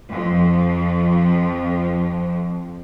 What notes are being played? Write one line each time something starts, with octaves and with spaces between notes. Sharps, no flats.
F2 F3